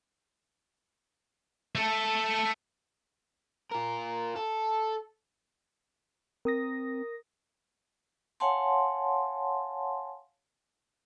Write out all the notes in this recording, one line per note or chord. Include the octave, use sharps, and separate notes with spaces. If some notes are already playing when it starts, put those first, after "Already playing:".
A3 A4
F4 A#4
A4
C4 A#4 D#6 A#6
C#5 F5 F#5 G#5 A5 C6